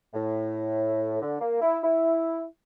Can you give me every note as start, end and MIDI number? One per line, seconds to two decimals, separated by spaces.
0.14 1.18 45
1.22 1.37 50
1.40 1.59 58
1.62 1.78 64
1.84 2.44 64